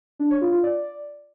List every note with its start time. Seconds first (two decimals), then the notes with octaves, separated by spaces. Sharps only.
0.19 D4
0.30 C#5
0.41 F4
0.52 F4
0.63 D5